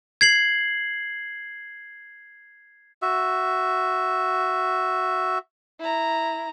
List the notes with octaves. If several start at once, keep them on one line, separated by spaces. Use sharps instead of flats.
G#6 C7 F#7
F#4 E5
E4 A#5